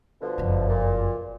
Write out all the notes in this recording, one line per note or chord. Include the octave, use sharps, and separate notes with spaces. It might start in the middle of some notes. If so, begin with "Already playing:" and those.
B2 D3 F3
F#1 F2
A#2